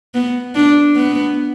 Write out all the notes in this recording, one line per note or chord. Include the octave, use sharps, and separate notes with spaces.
B3
D4
B3